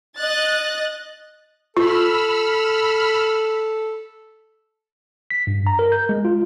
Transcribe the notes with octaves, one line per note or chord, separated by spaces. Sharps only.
D#5 F#6 A6
F4 A4 B5 E6 F6
B6
G2
A#5
A#4
G6
G#3
F4